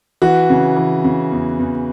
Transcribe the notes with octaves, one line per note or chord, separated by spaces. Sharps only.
E3 F#4
C#3
E3
C#3
E2
E2